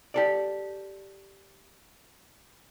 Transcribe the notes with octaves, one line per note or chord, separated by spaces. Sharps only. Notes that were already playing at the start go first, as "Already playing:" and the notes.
G4 A4 D5